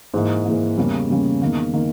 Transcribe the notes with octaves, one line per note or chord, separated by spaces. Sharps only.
G#2 E3 A#3
G#2 E3 A#3
E2 C#3 G3 A#3 C#4
E2 C#3 G3 A#3 C#4
E2 D#3 A#3
D#3 A#3